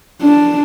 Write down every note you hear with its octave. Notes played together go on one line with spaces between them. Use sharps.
D4